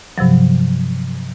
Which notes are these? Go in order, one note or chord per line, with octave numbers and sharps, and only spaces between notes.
G2 C3 F3 F#3